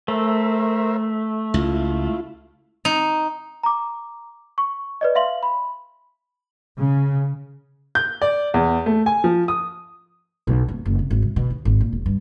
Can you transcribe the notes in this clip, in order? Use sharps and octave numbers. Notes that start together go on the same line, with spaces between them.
A3 A#4 C5 E5
C#2 E4 F4
D#4
A#5 D6
C#6
B4 D5 D#5
E5 F5 C6 F#7
B5
C#3
G6
D5
E2
A3
G#5
F3
D#6
B1
D#1
F#1
C3
G#1
C3
B2
D#2
G#1
A#2
E1
G2